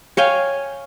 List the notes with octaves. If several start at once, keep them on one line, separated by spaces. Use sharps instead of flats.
C#5 F5 G5 G#5